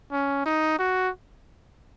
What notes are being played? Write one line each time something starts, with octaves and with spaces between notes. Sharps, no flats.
C#4
D#4
F#4